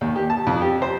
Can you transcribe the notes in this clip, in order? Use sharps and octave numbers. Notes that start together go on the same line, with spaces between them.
D#2
G4
A5
F2
G4
C5